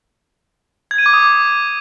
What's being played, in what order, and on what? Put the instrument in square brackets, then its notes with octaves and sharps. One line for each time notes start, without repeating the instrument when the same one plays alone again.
[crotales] G#6
D#7
D6
D#6